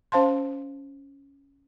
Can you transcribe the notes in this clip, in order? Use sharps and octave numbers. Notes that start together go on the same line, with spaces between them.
C#4 C5 F5 A5 C6